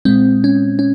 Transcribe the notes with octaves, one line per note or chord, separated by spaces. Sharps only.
A#2 G#3 C4
C#4
C#4